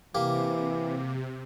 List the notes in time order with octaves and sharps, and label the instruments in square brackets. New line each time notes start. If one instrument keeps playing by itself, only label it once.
[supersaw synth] C3 [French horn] E3 [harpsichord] A#3 G4